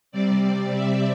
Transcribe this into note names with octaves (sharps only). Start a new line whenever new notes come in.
C3 G3 C4 D5
E5